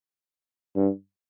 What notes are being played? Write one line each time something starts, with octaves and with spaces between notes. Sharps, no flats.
G2